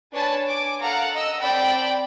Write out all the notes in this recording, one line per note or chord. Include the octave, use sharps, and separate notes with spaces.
D4 B4 C#5 G#5 A5
G#5 D6
A4 F5 F#5 A#5
D#5 E6
C4 D5 G5 A5 B5